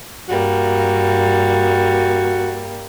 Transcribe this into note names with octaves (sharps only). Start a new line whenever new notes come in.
G2 G3 A#3 F#4